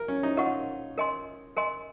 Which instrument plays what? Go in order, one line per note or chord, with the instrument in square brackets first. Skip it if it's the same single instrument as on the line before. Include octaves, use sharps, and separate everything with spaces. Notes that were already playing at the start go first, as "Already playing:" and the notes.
Already playing: [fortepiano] A#4
C#4
D#4
[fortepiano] F4 [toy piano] A#4 D#5 F#5 C#6
[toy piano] A#4 D#5 G#5 C6
A#4 D#5 G#5 C6